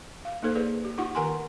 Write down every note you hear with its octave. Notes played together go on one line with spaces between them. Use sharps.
F5
A#3 D#4 A4 C5
G#4 B4 D5
G4
D#4 F4 G4 F#5 C#6
D#3 A#4 F#5 G#5 C6